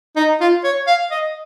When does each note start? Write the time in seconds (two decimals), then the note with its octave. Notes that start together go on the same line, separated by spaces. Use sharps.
0.16 D#4
0.40 F4
0.64 C#5
0.87 F5
1.11 D#5